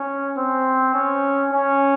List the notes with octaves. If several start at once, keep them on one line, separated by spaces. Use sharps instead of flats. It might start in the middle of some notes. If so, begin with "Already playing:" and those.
Already playing: C#4
C4
C#4
C#4